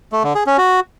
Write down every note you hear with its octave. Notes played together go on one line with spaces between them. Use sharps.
A3
D3
G#4
C#4
F#4